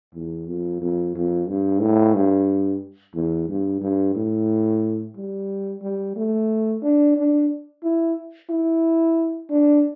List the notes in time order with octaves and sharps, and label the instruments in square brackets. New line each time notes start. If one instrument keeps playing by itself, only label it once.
[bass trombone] E2
F2
F2
F2
G2
A2
G2
E2
G2
G2
A2
G3
G3
A3
D4
D4
E4
E4
D4